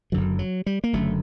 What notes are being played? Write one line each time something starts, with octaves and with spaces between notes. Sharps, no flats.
F#1 F#2 D3 F#3
F#3
G3
A#3
F#1 F#2 D3 A3